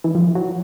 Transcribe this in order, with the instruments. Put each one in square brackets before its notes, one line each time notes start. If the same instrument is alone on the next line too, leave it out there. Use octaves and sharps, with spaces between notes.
[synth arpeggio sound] E3
F3
F#3